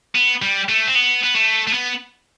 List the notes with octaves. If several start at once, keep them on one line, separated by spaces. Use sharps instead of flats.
B3
G3
A3
C4
B3
B3
A3
A3
B3